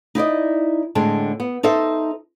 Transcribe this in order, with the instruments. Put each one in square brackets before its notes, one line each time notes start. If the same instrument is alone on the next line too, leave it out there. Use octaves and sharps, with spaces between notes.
[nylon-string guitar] D#4 E4 D5 D#5
A2 D3 G#3 C4 A5
B3
D#4 A4 C5 E5